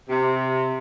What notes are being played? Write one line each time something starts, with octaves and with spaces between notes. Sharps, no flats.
C3